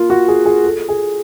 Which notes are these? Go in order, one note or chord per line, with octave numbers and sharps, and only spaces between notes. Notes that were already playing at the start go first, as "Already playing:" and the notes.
Already playing: A#3 F4
F#4
G#4
G#4
A4
G#4